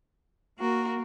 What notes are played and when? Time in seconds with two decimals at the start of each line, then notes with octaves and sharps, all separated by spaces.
0.59 A#3 F#4 A#4